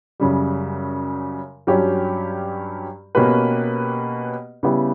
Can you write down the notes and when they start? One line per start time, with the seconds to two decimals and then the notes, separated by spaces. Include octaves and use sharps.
0.20 F#2 C#3 G3
1.67 G2 F#3 C#4 G4
3.15 B2 A#3 C#4 G4 B4
4.63 C#3 G3 B3 E4 G4